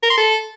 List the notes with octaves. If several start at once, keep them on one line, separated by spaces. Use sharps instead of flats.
A#4
C6
A4